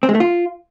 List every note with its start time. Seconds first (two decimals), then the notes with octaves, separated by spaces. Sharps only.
0.03 C4
0.09 G#3
0.14 A3
0.20 F4